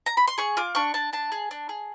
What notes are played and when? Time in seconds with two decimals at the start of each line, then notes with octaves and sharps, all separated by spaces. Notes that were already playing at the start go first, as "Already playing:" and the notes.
0.06 A#5
0.17 B5
0.27 C6
0.38 G#4 C#6
0.57 F4 D6
0.75 D4 C#6
0.94 D4 A5
1.13 D4 A5
1.32 G#4
1.51 D4
1.69 G#4